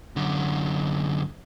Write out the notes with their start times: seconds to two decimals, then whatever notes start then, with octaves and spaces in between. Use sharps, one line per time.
0.16 F#2 D3